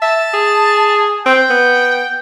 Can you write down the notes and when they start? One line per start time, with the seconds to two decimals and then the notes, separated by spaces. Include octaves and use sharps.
0.02 E5 A5
0.34 G#4
1.26 C4 G5
1.50 B3